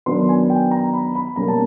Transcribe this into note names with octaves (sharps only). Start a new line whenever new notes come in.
D#3 F#3 B3 D4 C6
G#5
G5
A#5
B5
B5
B2 G3 A#3 C#4 A#5
A5